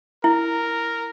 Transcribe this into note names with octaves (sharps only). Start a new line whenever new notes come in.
E4 A#4